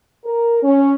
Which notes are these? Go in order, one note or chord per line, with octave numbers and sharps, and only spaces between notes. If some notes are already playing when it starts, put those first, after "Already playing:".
A#4
C#4